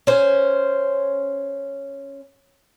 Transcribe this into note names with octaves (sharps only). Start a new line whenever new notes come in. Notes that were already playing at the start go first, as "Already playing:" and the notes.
C#4 C5